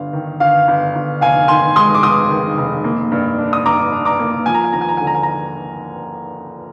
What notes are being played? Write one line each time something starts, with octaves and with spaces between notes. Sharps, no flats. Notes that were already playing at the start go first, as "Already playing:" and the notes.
Already playing: G1 G2 F5
D#3
G1 F5
G1
G1
F1 F5 G#5
D#3 G#5 C6
G#3 C6 D#6
D6
F1 C6 D#6
D#3
F1
A#3
G2
D4
D#6
G2 A#5 D6
D4
A#5 D6
A#3
F3 G#5
A#5
G#5
D#2 A#5
G#5
A#5
G#5
D3
A#5
G#5
A#5